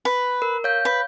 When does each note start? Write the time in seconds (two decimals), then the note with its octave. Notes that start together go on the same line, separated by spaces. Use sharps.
0.05 B4
0.42 A#4
0.64 C#5 F5 G6
0.85 B4